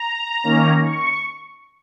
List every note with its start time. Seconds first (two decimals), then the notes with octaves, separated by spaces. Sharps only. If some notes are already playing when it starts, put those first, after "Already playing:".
Already playing: A#5
0.44 D#3 A#3 C#4
0.84 C#6